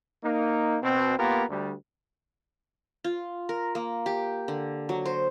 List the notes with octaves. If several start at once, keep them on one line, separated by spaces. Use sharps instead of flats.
A#3 D#4
B2 C4
A#3 B3 F4 G4 A#4
D2 G3
F4
A#4
A#3
G4
D3
F#3
C5